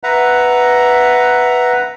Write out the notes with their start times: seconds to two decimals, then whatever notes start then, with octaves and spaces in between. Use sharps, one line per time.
0.04 B4 E5 F#5 A#5